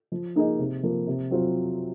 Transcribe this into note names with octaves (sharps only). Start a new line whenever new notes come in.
F3
A#3 D#4 G#4 D#5
C3
F3 A#3
C3
F#3 C4 F4 C5